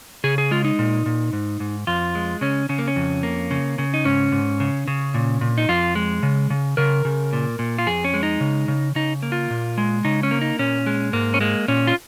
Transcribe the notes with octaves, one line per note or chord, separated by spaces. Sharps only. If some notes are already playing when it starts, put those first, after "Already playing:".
C#3 G#4
G#4
G#3 F4
D#4
A#2
A#2
G#2
G#2
F2 F4
G#3
C#3 C#4
C#3 C#4
A#3
C#4
F2
A#3
C#3
C#3
D#4
G#2 C#4
G#2
C#3
C#3
A#2
A#2
D#4
F2 F4
G#3
C#3
C#3
C#3 A#4
C#3
A#2
A#2
F4
F2 G#4
C#4
G#3
D#4
C#3
C#3
C#3 D#4
A#3
F4
A#2
G#3
C#3 D#4
C#4
A#3
D#4
A#2 C#4
G#3
G#2 A#3
C#4
G#3 A#3
A#2 C#4
F4